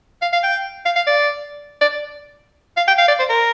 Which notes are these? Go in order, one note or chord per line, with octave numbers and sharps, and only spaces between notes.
F5
F5
G5
F5
F5
D5
D5
F5
G5
F5
D5
C5
A#4